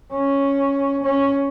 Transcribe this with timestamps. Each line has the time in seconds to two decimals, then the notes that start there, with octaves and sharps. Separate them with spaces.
0.13 C#4
1.04 C#4